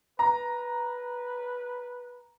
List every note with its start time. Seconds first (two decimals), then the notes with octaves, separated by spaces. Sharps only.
0.19 B4 A#5